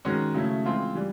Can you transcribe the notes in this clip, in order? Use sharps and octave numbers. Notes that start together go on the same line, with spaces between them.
D#3 G#3 C#4 F#4
C#3 F#3 A3 C#4 E4
E3 G#3 C4 F4
E3 G3